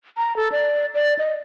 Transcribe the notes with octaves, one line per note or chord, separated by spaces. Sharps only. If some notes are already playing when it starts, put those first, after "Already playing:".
A#5
A4
D5
D5
D#5